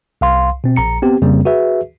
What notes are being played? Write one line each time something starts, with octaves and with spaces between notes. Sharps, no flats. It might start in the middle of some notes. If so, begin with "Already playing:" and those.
C2 F5 C6
B2 C4
A#1 A#5 C#7
B3 C4 G4
F2 C#3 G3 A#3 C4
F#4 G#4 B4 E5